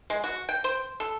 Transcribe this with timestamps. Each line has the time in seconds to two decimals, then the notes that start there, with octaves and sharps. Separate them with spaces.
0.10 G#3
0.24 F#4
0.49 G5
0.64 C5
1.00 A4